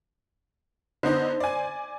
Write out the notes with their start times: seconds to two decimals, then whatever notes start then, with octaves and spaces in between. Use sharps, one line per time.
1.03 D3 B3 D#4 C5
1.40 D5 G#5